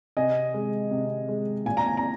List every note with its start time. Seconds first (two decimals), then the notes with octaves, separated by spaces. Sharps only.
0.17 C3 D#5 G#5
0.54 G#3
0.91 C3
1.29 G#3
1.66 A#2 G#5
1.77 A#5
1.87 G#5
1.97 A#5